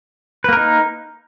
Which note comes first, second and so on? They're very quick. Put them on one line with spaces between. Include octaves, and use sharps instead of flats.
B4 A#3 A#4 D#4